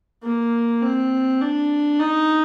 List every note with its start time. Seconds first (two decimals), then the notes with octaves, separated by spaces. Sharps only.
0.23 A#3
0.82 C4
1.41 D4
2.00 D#4